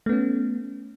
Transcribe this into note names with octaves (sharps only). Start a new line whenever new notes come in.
A3 B3 C#4